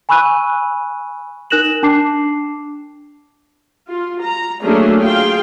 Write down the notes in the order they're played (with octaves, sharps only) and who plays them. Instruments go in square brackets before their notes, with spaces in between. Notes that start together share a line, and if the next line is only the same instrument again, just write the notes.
[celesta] G#5 B5 C#6 E6 F#6 D#7
D#4 A#4 F#6 A#6 E7 F#7
D4 A5 D6 C7
[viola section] F4
A#5
F#3 A3 A#3 C#4 D4 G#4
F4 G#4 F5 G5